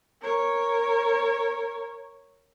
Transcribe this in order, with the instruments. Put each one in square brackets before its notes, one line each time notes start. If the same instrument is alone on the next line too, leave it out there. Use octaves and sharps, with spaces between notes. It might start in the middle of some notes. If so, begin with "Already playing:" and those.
[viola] A#4 C#5